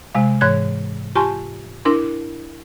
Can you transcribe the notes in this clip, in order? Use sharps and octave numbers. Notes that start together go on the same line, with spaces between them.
C3 G#3 F5
G#2 E3 C#5 F#6 G#6
F4 G4 G#5 A5 C6 C#6
D4 E4 A#4 C6